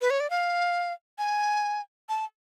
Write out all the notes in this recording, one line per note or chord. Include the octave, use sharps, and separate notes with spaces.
B4
C#5
D5
F5
G#5
A5